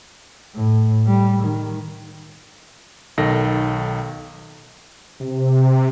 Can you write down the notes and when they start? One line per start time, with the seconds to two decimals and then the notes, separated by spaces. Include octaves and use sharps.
0.54 A2
1.07 G3
1.43 D#3
3.18 B1 D#3 A4 A#6
5.20 C3